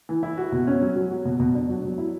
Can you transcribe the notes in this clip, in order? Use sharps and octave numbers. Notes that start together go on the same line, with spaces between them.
E3
E4
F#4
B2
C#4
F#3
F#3
F#4
B2
B2
D4
F#3
F#3
E4